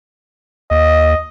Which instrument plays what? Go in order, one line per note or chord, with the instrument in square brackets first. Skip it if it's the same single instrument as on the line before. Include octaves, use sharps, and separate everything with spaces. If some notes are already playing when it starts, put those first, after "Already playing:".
[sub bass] D#2 [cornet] D#5